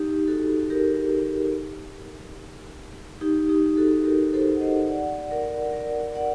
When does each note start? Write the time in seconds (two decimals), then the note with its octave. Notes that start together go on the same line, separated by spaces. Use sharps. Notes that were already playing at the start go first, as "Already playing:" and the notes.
Already playing: D#4 G4
0.28 F#4 A4
0.70 G4 A#4
3.21 D#4 G4
3.49 D#4 G4
3.77 F#4 A4
4.05 G4 A#4
4.33 A4 C5
4.56 F#5
4.60 C5 D#5
4.89 D5 F#5
5.31 A#4 D5
5.72 A#4 D5
6.15 D5 F#5